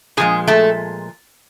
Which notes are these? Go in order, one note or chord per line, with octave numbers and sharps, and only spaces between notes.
A#2 F3 G#3 G#4
A3 A4